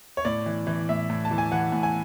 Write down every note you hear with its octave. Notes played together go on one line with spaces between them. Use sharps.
C#5
A2 D5
E3
E3
A2 E5
A2
A5
E3
G#5
E3 F#5
A2
G#5